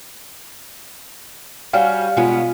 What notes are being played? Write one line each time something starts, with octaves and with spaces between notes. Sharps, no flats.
G3 C#4 F#4 F5
B2 G#3 B3 C#4 F4